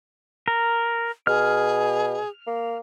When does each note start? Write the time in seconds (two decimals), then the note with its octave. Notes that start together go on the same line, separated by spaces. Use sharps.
0.48 A#4
1.27 B2 G#4 F6
2.47 A#3